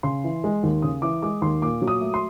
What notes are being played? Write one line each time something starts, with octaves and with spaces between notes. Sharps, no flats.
C#3 C6
E3
G#3
D#2
C#3 D#6
E3 D6
G#3 D6
D#2 C6
A#2 D6
F#3
D#6
A3
C6